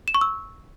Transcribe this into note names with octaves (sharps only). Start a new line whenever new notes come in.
E7
C#6
E6